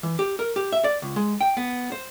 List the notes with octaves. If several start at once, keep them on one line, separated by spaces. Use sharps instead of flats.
E3
G4
A#4
G4
E5
D5
C#2
G#3
G5
B3
C5